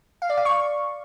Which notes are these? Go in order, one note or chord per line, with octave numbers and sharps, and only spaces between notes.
F5
D5
F5
C#6